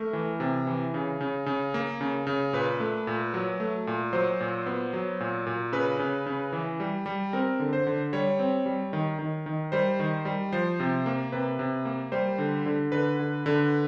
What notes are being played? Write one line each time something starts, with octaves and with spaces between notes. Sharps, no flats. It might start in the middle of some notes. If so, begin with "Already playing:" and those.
Already playing: A3 A#4
E3
C3
E3
C#3
C#3
C#3
A#3
C#3
C#3
A#2 B4
A3
A#2
F#3
A3
A#2
F#3 C5
A#2
B3
F#3
A#2
A#2
C#3 B4
C#3
C#3
E3
G3
G3
C4 A#4
D3
C5
D3
G3 C#5
C4
G3
D#3
D#3
D#3
G3 C5
D#3
G3
F3 C5
C3
A#3
C3 B4
C3
A#3
G3 C5
D3
D3
D3 B4
D3
D3